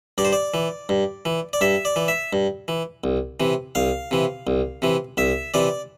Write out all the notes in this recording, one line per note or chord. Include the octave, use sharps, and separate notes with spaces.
G2 D5
C5
D5
E3
G2
E3
D5
G2 E5
D5
E3
E5
G2
E3
C2
C3 E3
C2 F5
C3 E3
C2
C3 E3
C2 E5
C3 E3 D5